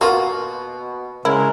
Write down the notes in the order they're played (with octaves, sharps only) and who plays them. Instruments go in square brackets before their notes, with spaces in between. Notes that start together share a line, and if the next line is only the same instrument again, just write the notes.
[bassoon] B2 [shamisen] A#3 F4 [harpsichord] F#4
[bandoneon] C#3 G#3 [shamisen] E4 [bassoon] A#4